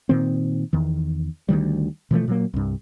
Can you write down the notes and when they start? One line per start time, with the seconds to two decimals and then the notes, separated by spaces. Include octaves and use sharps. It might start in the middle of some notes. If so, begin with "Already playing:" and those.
0.09 A#2 D#3 C4
0.73 E2 D#3
1.49 D2 D3 D#3 G3
2.11 B2 E3 F3 A3
2.28 A#2 F#3 A#3
2.54 C2 G2